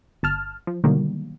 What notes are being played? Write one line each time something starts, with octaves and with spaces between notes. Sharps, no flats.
G1 A5 F6
F3
B2 D3 D#3 F#3 G3 A#3